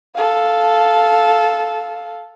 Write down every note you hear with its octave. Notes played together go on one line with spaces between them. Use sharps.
A4 F5